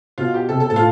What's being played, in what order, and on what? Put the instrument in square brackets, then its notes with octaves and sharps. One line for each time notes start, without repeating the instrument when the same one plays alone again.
[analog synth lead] B2 [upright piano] F4
[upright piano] G4
[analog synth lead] C3 [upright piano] A4
[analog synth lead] B2 [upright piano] A4
[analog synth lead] A2 [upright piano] A4
[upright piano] F4